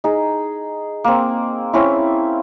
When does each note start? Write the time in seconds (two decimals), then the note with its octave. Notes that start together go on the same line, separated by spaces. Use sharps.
0.04 D#4 G#4
1.04 A#3 C4
1.73 C4 C#4 E4